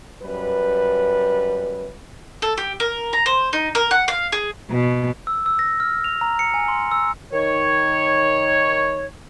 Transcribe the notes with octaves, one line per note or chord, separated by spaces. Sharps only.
F#2 G3 B4
A4
G4
A#4
A#5
C5
D#4
A#4
F#5
F5
G#4
B2
E6
E6
A#6
F6
F7
A#5
C#7
G#5
C6
E6
D#3 C#5